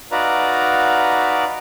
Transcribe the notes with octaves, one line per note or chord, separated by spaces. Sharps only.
D#4 F#4 B4 D5 F5 A#5